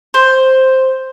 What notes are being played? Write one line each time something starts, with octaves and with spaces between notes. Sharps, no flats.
C5